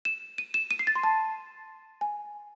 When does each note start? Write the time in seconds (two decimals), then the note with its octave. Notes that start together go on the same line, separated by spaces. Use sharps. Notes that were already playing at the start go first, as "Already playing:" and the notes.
0.05 E7
0.38 D#7
0.54 E7
0.71 D#7
0.79 C7
0.87 A6
0.95 C6
1.04 A5
2.01 G#5